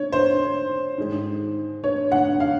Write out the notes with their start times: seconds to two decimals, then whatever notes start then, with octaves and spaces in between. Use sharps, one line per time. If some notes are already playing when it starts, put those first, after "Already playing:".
Already playing: C#5
0.12 C5
0.98 G#2 D#3 G#3
1.84 C#5
2.12 F#5
2.40 F5